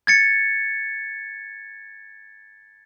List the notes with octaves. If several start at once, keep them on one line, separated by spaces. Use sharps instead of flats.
G#6 A6 C#7